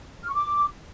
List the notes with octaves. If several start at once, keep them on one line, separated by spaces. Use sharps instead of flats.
F6
C#6
D6